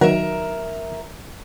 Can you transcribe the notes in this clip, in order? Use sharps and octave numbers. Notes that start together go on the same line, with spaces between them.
D#3 F#3 A#4 E5 F#5